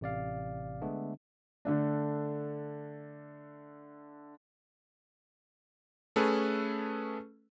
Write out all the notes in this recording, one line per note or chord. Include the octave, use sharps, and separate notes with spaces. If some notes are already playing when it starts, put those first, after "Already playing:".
A1 C3 D5 F5
D3 G#3 A3 B3 D4
D3 A3 D4
A3 C#4 G#4 A4 B4